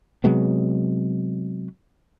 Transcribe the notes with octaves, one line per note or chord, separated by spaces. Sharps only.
C3 F#3 G#3 B3